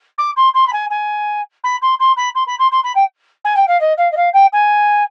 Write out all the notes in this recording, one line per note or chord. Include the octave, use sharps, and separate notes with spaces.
D6
C6
C6
B5
G#5
G#5
B5
C6
C6
B5
C6
B5
C6
C6
B5
G5
G#5
G5
F5
D#5
F5
D#5
F5
G5
G#5